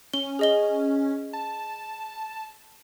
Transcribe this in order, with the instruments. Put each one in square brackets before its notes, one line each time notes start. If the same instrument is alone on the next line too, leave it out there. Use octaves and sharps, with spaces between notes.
[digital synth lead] C#4 [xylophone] G7
[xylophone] G#4 D#5 G7
[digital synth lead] A5